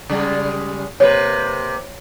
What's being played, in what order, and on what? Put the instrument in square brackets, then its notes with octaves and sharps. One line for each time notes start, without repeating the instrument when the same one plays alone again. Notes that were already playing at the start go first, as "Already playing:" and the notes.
[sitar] C#3 G3 G#3
[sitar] C3 A#3 B4 [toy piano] C#5